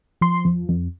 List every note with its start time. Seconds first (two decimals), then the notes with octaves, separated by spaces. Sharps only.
0.21 F3 C6
0.45 F2
0.69 F2